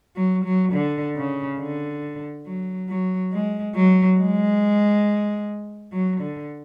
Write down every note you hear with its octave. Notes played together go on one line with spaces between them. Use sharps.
F#3
F#3
D3
C#3
D3
F#3
F#3
G#3
F#3
G#3
F#3
D3